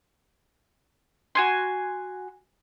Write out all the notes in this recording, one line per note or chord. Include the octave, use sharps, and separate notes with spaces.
F#4 G#5 C6